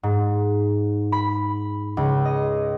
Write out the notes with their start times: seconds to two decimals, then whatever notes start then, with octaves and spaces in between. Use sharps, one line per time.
0.03 G#2
1.12 B5
1.97 C#2
2.25 D#5